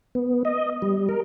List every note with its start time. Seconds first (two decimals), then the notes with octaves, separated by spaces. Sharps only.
0.15 B3
0.45 D#5
0.82 G3
1.09 A#4